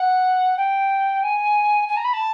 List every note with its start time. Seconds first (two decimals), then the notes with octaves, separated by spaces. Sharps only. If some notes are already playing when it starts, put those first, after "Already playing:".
Already playing: F#5
0.57 G5
1.23 G#5
1.88 G#5
1.96 A#5
2.04 B5
2.13 A5